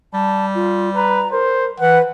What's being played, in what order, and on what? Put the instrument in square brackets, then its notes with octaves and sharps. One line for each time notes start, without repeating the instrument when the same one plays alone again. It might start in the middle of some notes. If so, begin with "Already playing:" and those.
[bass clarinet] G3 [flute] A5
[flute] F4
[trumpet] B4 [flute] A#5
[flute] A#4 [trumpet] C5
[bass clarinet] E3 [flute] B4 [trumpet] F#5